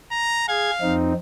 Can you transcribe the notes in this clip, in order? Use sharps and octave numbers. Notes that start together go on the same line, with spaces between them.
A#5
G#4 F5 G#6
F2 C4 D#4